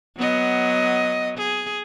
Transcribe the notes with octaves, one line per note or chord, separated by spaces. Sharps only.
F#3 B3 D#5
G#4